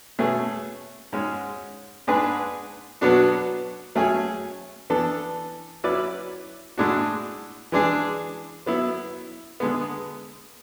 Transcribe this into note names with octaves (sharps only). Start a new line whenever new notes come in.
B2 A3 C#4 G#4
G#2 G#3 C#4
G#2 G#3 D4 G#4 B4
B2 F#3 B3 D4 F#4
F#3 A3 C#4 G#4
E3 B3 D4 A4
F#3 C#4 E4 B4 D5
A2 G#3 D4 F#4
E3 G#3 D4 G#4
F#3 B3 E4
D3 G#3 B3